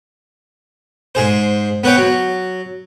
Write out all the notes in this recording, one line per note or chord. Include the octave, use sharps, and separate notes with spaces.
G#2 G#4 C5
B3 B4 C#5 G5
F#3